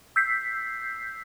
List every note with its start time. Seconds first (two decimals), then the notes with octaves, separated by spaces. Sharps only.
0.16 E6 G6 B6 C7